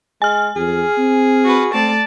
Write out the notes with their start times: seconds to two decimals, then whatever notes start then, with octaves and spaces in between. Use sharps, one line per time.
0.22 G#3 G#5 F6
0.56 F2 G#4
0.98 C4
1.44 F#4 B4
1.74 A3 C4 D5 A5